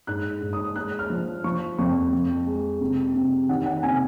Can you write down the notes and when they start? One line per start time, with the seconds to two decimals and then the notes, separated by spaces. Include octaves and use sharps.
0.07 G#2 F#6
0.42 G#2
0.53 D#6
0.76 G#3 F#6
0.99 F6
1.10 F3
1.44 F3 C#6
1.78 F2 C#6
2.12 F2
2.47 G#3
2.81 C3
3.15 C3
3.49 D#3 F#5
3.66 F#5
3.83 C3 G#5